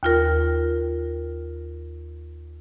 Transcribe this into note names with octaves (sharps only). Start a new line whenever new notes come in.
D#2 F4 A#4